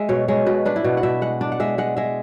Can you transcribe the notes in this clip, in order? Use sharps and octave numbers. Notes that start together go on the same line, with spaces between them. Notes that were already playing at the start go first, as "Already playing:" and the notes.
Already playing: G#3 E5
B2 C#5
G#3 C#5
B2 B4
D4 B4
E4
B2 F#4
F#5
B2 E5
G#3 F#5
D4 D5
F#5
G#3 E5
G#3 F#5
G#3 E5